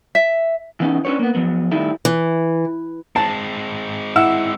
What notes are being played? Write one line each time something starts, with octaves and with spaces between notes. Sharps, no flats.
E5
E3 B3 C#4 D#4
C#4 D4 G4 B4 C#5
A#3 B3
F3 F#3 B3
A2 D#3 G3 D#4 E4 A4
E3
G#3 C4 A5
E4 F#5 E6